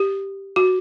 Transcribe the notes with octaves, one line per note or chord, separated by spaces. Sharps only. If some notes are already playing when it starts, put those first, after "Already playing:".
Already playing: G4
F#4